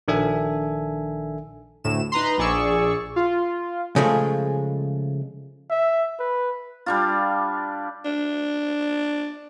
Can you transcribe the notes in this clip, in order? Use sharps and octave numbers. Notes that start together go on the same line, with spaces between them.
A#1 D#3 D4 A4 E5 G#5
D2 A2 E7
D#4 B4 A#5 C6
A#1 G#4 D5 C#6 E6
F4
C#3 F3 G#3 A3
E5
B4
G3 D4 F4
D4